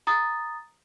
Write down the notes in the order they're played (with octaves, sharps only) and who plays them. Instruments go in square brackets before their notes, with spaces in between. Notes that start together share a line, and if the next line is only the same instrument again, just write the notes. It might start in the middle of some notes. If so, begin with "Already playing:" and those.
[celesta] A#5 D#6 A6